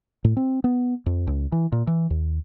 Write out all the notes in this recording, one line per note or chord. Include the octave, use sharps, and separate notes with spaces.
A2
C4
B3
F2
C#2
E3
A#2
E3
D#2